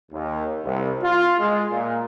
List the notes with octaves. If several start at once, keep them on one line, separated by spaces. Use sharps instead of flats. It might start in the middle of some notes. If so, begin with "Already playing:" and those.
D#2
C2
F4
G#3
A#2